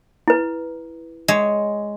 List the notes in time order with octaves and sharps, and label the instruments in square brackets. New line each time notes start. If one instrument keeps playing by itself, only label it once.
[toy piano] E4 B4
[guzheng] G#3 C#5